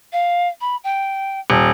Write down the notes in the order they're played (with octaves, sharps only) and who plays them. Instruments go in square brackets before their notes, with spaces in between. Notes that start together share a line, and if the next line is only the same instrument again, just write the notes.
[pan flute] F5
B5
G5
[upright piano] D#1